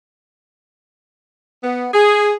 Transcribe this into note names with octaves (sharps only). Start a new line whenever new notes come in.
B3
G#4